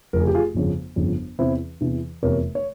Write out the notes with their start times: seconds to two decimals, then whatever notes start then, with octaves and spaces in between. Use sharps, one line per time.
0.13 F1 F2 C#3 A#4
0.20 G#4
0.27 G4
0.34 F4 G#4
0.54 G1 F2 C#3
0.96 G1 F2 C#3
1.39 E2 C3 E3 C4 E4
1.81 E2 C3 E3
2.23 F1 E2 C3 F3 A#4 C#5
2.55 C#5